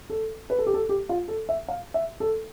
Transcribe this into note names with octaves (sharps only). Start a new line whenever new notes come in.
A4
B4
A4
G4
A4
G4
F4
A4
E5
F5
E5
A4